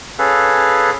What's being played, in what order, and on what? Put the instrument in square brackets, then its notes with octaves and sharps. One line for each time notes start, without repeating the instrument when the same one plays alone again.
[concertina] C#4 G#4 A4 B4 F5